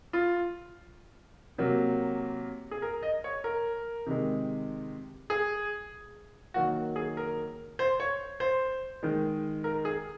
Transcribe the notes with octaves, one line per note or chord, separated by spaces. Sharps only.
F4
C3 F#3 A#3
G#4
A#4
D#5
C#5
A#4
C3 D#3 G#3
G#4
D#3 F#3 A#3 F#4
G#4
A#4
C5
C#5
C5
D#3 G#3
A#4
G#4